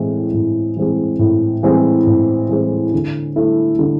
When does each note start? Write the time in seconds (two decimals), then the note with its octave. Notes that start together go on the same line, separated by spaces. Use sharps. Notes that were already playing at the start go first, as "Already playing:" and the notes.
Already playing: A2 E3 G#3 C4 G#4
0.33 A2
0.77 E3 G#3 C4 G#4
1.19 A2
1.63 E3 G#3 C4 G#4
2.07 A2
2.49 E3 G#3 C4 G#4
2.93 D3
3.36 A3 E4 A4
3.79 D3